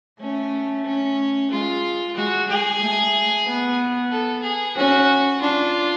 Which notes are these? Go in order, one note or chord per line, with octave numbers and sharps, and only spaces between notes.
A3 C#4
C#4
G#3 F4
G#3 F#4
G#3 G#4
A3
B3
A4
G#4
C#4 F#4
D4 F4